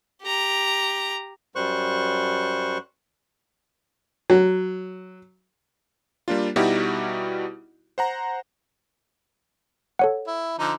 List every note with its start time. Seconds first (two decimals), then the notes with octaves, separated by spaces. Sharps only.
0.23 G4 A#5
1.56 F#2 G3 C5 C#6 F#6
4.30 F#3
6.28 G3 A#3 D4 F4
6.56 B2 G3 D#4 E4 F#4 G4
7.98 C5 F#5 A#5
9.99 A4 C#5 F#5
10.27 E4
10.59 D3 F3 D#4